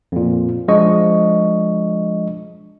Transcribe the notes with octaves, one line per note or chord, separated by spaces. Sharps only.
F2 A#2
F3 G#3 D4 D#5 C#6